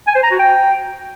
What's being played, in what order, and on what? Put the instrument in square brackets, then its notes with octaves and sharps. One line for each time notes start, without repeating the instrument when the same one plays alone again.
[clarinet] G#5
C5
A#5
F#4
G5